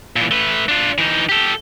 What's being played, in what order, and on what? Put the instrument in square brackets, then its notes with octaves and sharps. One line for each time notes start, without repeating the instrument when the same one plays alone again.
[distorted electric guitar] A#2 E3
A3 B4
D4 F4
E3 D#4
G4 A4